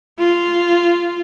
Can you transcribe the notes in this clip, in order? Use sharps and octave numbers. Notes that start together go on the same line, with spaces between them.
F4